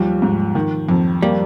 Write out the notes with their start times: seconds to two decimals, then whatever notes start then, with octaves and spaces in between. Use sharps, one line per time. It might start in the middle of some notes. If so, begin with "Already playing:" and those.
Already playing: D#2 F3 G3
0.22 G#2
0.55 D#3
0.89 F2
1.22 G3 A#3